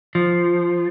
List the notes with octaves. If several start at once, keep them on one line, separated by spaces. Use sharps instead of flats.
F3